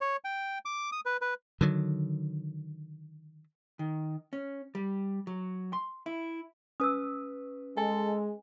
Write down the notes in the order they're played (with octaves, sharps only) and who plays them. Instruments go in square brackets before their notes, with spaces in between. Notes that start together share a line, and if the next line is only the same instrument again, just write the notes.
[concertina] C#5
G5
D6
D#6
B4
B4
[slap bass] D3 D#3 F#3
[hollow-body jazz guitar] D#3
C#4
G3
F#3
C6
E4
[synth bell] C#4 B4 [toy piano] D#6 E6
[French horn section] G#3 [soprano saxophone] A4 [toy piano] G#5